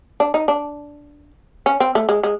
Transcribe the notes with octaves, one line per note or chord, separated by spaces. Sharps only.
D4
D#4
D4
C#4
C4
A3
G#3
G#3